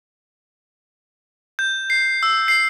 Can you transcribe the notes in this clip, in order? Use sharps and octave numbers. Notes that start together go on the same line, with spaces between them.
G6
C7
E6
C7